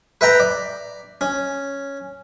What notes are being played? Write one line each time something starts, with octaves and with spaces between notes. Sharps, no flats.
B4 E5 G5 A#5
D5
C#4